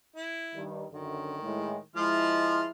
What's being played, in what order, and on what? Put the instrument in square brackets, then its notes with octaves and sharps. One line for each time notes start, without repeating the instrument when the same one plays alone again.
[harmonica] E4
[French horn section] G2 D#3
[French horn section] F#2 D3 [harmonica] D#3
[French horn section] A2 G#3
[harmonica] F3 C6 F6 [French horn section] G#3 E4